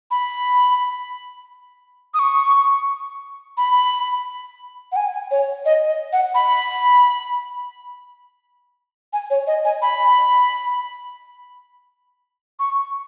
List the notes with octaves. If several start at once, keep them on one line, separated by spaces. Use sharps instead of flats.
B5
D#6
C#6
B5
F#5
G#5
C#5
D#5
F#5
B5
G#5
C#5
D#5
G#5
B5
C#6